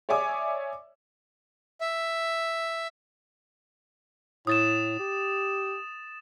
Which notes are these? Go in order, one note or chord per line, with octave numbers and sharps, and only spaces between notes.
C#5 D5 E5 G#5 D6 D#6
E5
A2 D#6 A6 E7
G4